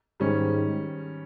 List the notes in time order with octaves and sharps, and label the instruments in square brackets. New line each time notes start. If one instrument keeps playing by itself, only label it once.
[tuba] G#2 [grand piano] D#3 G3 C#4